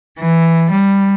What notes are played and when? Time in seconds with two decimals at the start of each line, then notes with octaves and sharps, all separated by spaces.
0.19 E3
0.71 G3